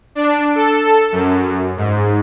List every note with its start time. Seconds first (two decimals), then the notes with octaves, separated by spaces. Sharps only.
0.15 D4
0.55 A4
1.12 F#2
1.77 G#2